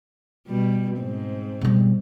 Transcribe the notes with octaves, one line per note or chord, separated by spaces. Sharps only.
B2 G3
G#2 C4
B2 G3